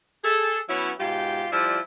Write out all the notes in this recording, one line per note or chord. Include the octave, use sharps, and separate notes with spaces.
G#4 A4
F#3 B3 C#4 E4
G#2 B2 F4 G4
F3 G3 E4 F4 D5